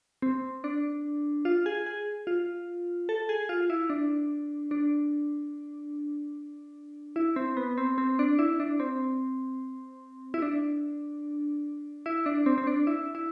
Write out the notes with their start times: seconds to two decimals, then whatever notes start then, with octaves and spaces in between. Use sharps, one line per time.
0.22 C4
0.64 D4
1.45 F4
1.66 G#4
1.86 G#4
2.27 F4
3.09 A4
3.29 G#4
3.49 F4
3.70 E4
3.90 D4
4.71 D4
7.16 E4
7.36 C4
7.57 B3
7.78 C4
7.98 C4
8.19 D4
8.39 E4
8.60 D4
8.80 C4
10.34 E4
10.42 D4
12.06 E4
12.26 D4
12.46 C4
12.58 C4
12.67 D4
12.87 E4
13.15 E4